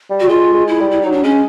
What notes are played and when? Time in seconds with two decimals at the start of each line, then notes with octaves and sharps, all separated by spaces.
0.10 G3
0.20 F#4
0.29 G#3 F4
0.54 G#3
0.68 E4
0.80 G3
0.91 E4
1.02 F#3 D#4
1.12 D4
1.23 G#3 C#4